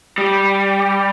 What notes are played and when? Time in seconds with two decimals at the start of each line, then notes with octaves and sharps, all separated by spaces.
0.18 G3